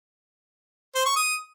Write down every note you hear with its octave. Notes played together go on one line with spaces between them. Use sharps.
C5
C#6
D#6